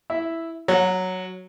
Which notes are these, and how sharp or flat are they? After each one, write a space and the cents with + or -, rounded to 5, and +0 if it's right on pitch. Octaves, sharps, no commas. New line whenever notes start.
E4 +0 E5 +0
F#3 +0 F#5 -35